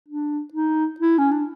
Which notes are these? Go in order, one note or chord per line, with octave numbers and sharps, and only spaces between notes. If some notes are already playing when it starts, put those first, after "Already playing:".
D4
D#4
E4
C#4
D4